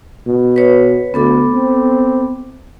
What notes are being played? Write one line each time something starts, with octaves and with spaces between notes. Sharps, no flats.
B2
B4 C#5
D2 B3 A4 D6
C4